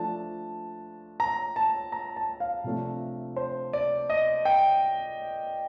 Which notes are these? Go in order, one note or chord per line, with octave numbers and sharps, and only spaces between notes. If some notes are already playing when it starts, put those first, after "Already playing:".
Already playing: F3 A3 D4 A5
A#5
A5
A#5
A5
F5
C3 F3 A3 D4
C5
D5
D#5
G5